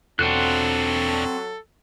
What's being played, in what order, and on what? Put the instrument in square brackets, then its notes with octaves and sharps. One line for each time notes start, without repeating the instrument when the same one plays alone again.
[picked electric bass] E1 [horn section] F#3 A4 [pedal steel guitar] C4 F#4 F#6 [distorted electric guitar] D4 F4